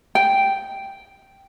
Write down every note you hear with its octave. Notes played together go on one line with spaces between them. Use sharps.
G5